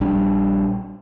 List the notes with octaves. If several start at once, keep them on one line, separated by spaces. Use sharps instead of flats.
A#1 G3 D4